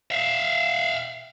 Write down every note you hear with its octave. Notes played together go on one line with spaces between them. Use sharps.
E5 F5